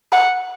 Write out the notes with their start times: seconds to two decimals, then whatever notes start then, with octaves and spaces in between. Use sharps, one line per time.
0.12 F#5